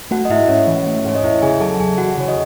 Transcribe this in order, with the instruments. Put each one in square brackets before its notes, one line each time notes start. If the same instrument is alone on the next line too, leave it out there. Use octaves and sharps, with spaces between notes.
[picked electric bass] A3 [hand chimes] F#4 F#5
[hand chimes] D#5
[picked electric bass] G#2 [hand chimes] E4 E5
[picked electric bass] G#2 [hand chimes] C#4 C#5
[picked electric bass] E3
A3
[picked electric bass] G#2 [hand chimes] C#5
[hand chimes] D#5
[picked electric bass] E2 [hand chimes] E4 E5
[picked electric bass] C#3 [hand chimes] G#4 G#5
[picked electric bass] F#3 [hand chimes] A4 A5
[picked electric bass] E2 [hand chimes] G#4 G#5
[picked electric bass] E2 [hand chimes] F#4 F#5
[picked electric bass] C#3 [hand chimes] C#5
[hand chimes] D#5